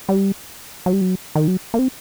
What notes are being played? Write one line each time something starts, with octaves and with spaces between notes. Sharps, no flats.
G3
F#3
G3
F#3
D#3
F#3
A#3
C4